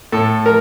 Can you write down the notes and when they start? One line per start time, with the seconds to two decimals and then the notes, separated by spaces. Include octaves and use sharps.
0.12 A2 A4
0.46 A#4